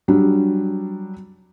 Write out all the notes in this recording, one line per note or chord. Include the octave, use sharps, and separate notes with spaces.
F#3 G3 D4